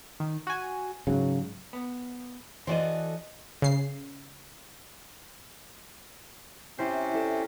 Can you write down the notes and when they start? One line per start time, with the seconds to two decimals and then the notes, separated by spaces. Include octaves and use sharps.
0.20 D#3
0.47 F#4 G#5
1.07 G#2 C#3 F#3
1.73 B3
2.67 E3 F#4 A4 C5 D5 D#5
3.62 C#3 C7
6.78 C3 C4 C#4 E4 C5
7.14 E4 A4 D5